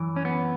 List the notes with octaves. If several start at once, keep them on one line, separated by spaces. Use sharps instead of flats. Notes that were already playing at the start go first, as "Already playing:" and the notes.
Already playing: F#2 E3
C#4
B3